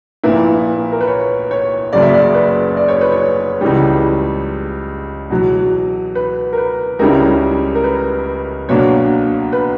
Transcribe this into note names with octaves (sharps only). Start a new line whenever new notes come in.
A#1 A#2 A#3 E4 B4
A#4
B4
C#5
C#5
F#1 F#2 C#3 D5
E5
D5
B4
D5
C#5
B4
C#5
C#2 C#3 E3 G3
E2 B2 F#3
B4
A#4
B4
C#2 C#3 G3 C#4 E4 A#4
A#4
B4
B1 B2 A#3 D4 C#5
B4